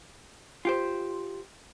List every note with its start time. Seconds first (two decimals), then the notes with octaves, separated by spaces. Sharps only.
0.65 F4 G4 C5